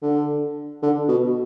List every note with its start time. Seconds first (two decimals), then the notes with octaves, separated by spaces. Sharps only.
0.02 D3
0.83 D3
1.09 B2